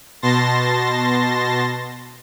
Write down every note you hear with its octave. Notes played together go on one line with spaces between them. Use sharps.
B2 A5 C6 A6 A#6